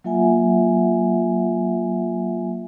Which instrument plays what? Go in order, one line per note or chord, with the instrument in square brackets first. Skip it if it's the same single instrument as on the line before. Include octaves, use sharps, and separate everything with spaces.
[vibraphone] F#3 A#3 F4 E5 F#5 G#5